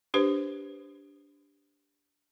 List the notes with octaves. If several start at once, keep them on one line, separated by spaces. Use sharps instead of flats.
D4 G4 B4 C5